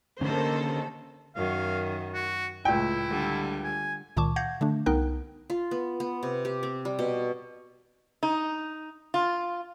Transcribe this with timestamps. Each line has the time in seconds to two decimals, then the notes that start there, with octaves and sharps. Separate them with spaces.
0.21 D3 D#3 A#3 C#4 G4 A4 C5
1.36 F#2 D#3 F5
2.14 F#4
2.65 C#2 A2 E4 G5
3.09 D3 G3
3.64 G#5
4.17 C#2 A#2 D#3 A5 C#6 D6
4.36 F5 F#5 G6 G#6 A#6
4.61 D3 A3 D4
4.86 C2 B3 D#4 A#4 G5 F#6
5.50 F4
5.71 B3
6.00 B3
6.23 C3
6.45 G4
6.63 C4
6.85 G3
6.99 B2
8.23 D#4
9.14 F4